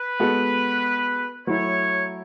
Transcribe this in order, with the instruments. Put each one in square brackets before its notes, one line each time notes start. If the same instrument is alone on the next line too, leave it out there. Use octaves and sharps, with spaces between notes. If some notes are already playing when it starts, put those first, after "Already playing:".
Already playing: [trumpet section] B4
[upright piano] G#3 B3 F#4 A4
[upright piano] F#3 A3 E4 [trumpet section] C#5